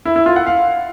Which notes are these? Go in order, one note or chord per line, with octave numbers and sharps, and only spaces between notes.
E4
E4
F4
F#5
F5